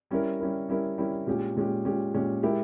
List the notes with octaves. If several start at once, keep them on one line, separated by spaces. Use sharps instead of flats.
G3 C#4 E4 A#4
G3 C#4 E4 A#4
G3 C#4 E4 A#4
G3 C#4 E4 A#4
A#2 G#3 C#4 G4
A#2 G#3 C#4 G4
A#2 G#3 C#4 G4
A#2 G#3 C#4 G4
G#3 E4 G4 A#4